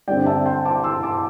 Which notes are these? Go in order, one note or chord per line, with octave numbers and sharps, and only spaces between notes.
G2 D3 C4 D5 G5
E5 A5
G5 C6
A5 D6
C6 E6
A5 D6